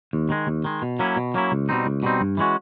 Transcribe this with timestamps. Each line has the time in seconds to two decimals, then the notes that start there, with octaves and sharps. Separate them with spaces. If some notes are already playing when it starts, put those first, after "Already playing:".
0.13 D#2
0.30 D#3 G#3
0.47 D#2
0.64 D#3 G#3
0.82 B2
0.99 F#3 A#3 C#4 E4
1.17 B2
1.34 F#3 A#3 C#4 E4
1.52 C#2
1.69 B2 G3 C4 D#4
1.86 C#2
2.03 B2 G3 C4 D#4
2.21 G2
2.37 E3 G#3 C#4 F#4